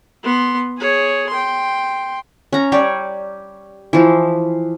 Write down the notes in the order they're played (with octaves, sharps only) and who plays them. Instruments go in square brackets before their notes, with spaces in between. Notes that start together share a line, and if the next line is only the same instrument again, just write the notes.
[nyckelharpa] B3 C6
G#4 C#5
G5 C6
[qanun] C#4 A#5
G3 G4 C#5 D5
E3 F3